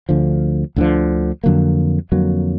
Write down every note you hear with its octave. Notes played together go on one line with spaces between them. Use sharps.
D2 D3 F3
D2 D3 F3
F2 D3 F#3 A#3
F2 D3 F#3 A#3